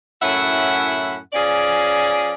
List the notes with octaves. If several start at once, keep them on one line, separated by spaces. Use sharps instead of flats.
F#2 A2 C#4 E4 E5 F#5
F3 C#4 G#4 D5